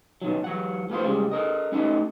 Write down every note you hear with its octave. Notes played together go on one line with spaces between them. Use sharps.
B2 D#3 F#3
E3 F#3 F#5
A3 B3 F4 C5
A2 C#3 G3 G#3
A4 A#4 D#5
A3 C#4 D#4 E4 A4 D#5